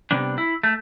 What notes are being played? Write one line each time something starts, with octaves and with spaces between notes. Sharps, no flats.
C3 G3 B3 D4
E4
A3